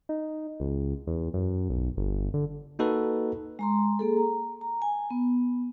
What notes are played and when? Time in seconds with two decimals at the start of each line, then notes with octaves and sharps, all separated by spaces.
0.09 D#4
0.60 C#2
1.07 E2
1.34 F#2
1.70 B1
1.97 G1
2.34 D3
2.79 A#3 D#4 F#4 A4 B4
3.59 G#3 A#5 C6
3.99 A#3 G#4 A4
4.17 A#5
4.61 A#5
4.82 G#5
5.10 B3